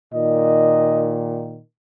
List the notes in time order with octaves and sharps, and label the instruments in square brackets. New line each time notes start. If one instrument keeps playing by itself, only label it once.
[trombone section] A#2 D#3 [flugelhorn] D#5